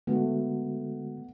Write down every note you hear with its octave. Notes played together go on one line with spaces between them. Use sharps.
D3 G#3 A3 B3 F#4